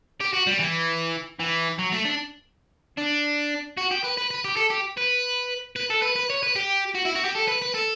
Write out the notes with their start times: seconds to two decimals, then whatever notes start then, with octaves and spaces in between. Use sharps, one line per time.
0.20 G4
0.33 F#4
0.47 G3
0.59 E3
1.39 E3
1.79 F#3
1.92 A3
2.05 D4
2.98 D4
3.77 F#4
3.91 G4
4.04 B4
4.17 B4
4.31 B4
4.45 G4
4.57 A4
4.70 G4
4.98 B4
5.76 B4
5.90 A4
6.02 B4
6.16 B4
6.30 C#5
6.43 B4
6.56 G4
6.95 F#4
7.05 E4
7.16 F#4
7.25 G4
7.35 A4
7.48 B4
7.62 B4
7.75 A4